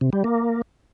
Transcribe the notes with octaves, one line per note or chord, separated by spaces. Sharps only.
C3
G3
A#3